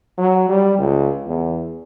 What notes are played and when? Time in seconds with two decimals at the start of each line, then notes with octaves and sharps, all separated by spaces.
0.18 F#3
0.49 G3
0.78 C#2
1.27 E2